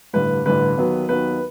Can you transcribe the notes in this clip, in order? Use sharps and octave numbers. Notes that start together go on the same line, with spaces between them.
A1 G2 D3 B4
A1 G2 D3 B4
D#2 D#3 F#3 B3
D#2 D#3 F#3 B3 B4